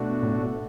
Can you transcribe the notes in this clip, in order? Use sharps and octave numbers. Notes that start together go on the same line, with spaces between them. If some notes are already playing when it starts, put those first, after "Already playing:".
Already playing: B2 A3 D4 F#4
A2